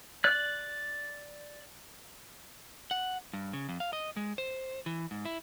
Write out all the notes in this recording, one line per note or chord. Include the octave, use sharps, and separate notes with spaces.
D5 F#6
F#5
G2
C#3
F2
F5
D#5
G#3
C5
E3
G#2
E4